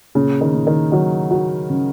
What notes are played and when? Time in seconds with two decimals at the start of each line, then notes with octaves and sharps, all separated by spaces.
0.15 A#2 C#3
0.41 D#3
0.54 A#2
0.67 D#3
0.92 D#3 F#3 F#4
1.31 F#4
1.70 C#3